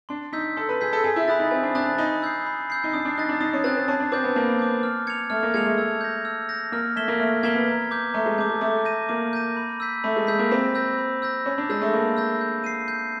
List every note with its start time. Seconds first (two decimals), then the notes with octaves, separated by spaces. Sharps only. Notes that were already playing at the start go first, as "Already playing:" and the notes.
0.09 D4 C6
0.33 D#4 E6 G6 B6
0.57 A4 C6
0.69 B4
0.81 G#4 E6 G6 B6
0.93 A4
1.04 G#4 G#5
1.16 E4
1.28 E4 B5 D#6 F#6 A6
1.40 D#4
1.51 C4 G#5
1.63 D4
1.75 D4 B5 D#6 F#6 A6
1.87 D4
1.98 D#4 B5
2.22 E6 G6 C7
2.46 B5
2.70 E6 G6 C7
2.84 D#4
2.94 D4 D#6
3.05 D4
3.18 D#4 F#6 A6
3.29 D4
3.40 D#4 D#6
3.53 C#4
3.64 C4 F#6 A6
3.77 C4
3.88 C#4 A5
4.00 D4
4.12 C4 D6 G6
4.24 B3
4.36 A#3 A5
4.59 D6 G6
4.83 F6
5.07 G#6 C#7 F7
5.30 A3 F6
5.43 A#3
5.54 G#3 G#6 C#7 F7
5.66 A3
5.78 E6
6.01 G6 A#6
6.25 E6
6.49 G6 A#6
6.72 A#3 F6
6.96 A3 G#6 B6 E7 G7
7.08 A#3
7.20 A3 F6
7.43 A#3 G#6 B6 E7 G7
7.55 B3
7.67 A#5
7.91 D6 G6
8.14 A3 A#5
8.26 G#3
8.38 A3 D6 G6
8.50 G#3
8.61 A3 D6
8.85 G6 A#6 D#7
9.09 A#3 D6
9.33 G6 A#6 D#7
9.57 B5
9.80 E6 G6 B6
10.04 A3 B5
10.16 G#3
10.27 G#3 E6 G6 B6
10.39 A#3
10.51 C4 B5
10.75 E6 G6 A#6
10.98 B5
11.22 E6 G6 A#6
11.46 C#4 B5
11.58 D4
11.70 G#3 E6 G6 A#6
11.81 A3
11.93 A#3 B5
12.17 E6 G6 A#6
12.41 G6
12.64 C7 D#7
12.88 G6